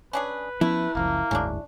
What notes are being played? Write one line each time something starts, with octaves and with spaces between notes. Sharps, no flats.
C#4 D4 G#4 B4
F3 A3 B3 C#4 E4
F#1 C#2 F3 A#3
F#1 D2 G#2 C#4 D4